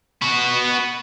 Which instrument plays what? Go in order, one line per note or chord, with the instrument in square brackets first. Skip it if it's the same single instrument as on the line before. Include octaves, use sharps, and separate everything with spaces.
[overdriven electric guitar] B3 F#4